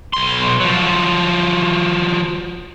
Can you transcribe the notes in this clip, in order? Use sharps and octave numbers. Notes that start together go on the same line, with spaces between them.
B1 C6
F3 F#3